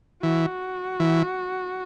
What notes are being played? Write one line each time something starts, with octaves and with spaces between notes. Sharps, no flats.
E3 F#4
E3